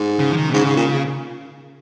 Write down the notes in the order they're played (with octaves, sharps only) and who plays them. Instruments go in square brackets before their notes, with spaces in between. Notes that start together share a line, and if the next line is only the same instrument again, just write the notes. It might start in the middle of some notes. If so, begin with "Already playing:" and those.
Already playing: [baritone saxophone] G#2
[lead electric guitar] C#3
F3
D#3
B2
[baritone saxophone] G#2 [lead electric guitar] C#3
[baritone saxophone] G#2
A#2